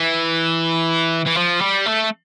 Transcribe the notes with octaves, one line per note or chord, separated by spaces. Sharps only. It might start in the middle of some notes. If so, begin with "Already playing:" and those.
Already playing: E3
E3
F3
G3
A3